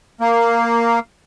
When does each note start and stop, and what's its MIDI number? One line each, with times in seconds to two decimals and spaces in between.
0.21 0.99 58